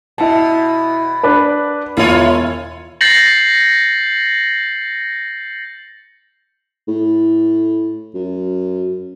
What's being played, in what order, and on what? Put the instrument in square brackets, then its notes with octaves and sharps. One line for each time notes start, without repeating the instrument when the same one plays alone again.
[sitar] B2 [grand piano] E4 A5
[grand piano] D4 B4
[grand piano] E1 [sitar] E4 F4 C#5
[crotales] G6 A6 A#6 C7 C#7 F#7
[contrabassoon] A2
F#2